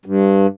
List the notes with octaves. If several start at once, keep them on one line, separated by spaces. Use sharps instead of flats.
G2